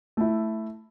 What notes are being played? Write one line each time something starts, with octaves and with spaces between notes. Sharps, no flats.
A3 E4